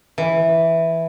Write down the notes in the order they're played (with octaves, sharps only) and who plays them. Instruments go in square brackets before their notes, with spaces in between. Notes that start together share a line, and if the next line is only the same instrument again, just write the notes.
[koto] E3